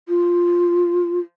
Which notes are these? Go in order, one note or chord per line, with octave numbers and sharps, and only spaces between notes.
F4